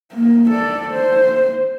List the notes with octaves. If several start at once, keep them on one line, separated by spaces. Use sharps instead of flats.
A#3
A4 D5
C5